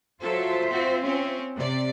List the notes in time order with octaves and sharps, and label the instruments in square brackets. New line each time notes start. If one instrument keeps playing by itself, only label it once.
[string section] F#3 A4 [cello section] F4 C5 E5
[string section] C4 F#4
C4 C#4
C3 D5